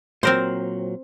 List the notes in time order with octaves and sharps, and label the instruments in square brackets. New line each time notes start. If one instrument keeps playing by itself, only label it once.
[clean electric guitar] A#2 F#3 [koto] C4 A#4 C5